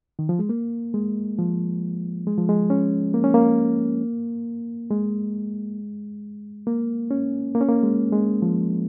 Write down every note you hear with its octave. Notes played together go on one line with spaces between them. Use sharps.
D#3
F3
G#3
A#3
G#3
F3
G#3
F3
G#3
C#4
A#3
C#4
A#3
G#3
A#3
C#4
A#3
C#4
A#3
G#3
G#3
F3